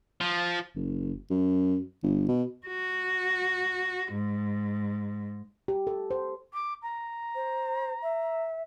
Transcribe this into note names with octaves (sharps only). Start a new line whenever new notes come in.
F3
F#1
F#2
G1
B2
F#4
G#2
G4
A4
C5
D6
A#5
C5
E5